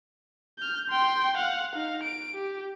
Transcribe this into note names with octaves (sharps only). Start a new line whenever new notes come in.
F6 G6
G5 C6
F5 F#5
D#4 F5
D7
G4